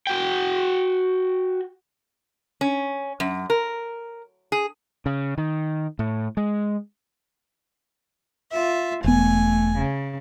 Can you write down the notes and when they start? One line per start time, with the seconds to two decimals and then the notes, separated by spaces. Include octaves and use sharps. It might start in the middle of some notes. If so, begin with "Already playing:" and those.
0.07 F#4 G5
2.61 C#4
3.20 F#2
3.50 A#4
4.52 G#4
5.06 C#3
5.38 D#3
5.99 A2
6.37 G#3
8.52 F4 E5
9.04 E1 A3 B3 G#5
9.79 C#3